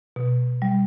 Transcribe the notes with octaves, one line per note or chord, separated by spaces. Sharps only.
B2
G3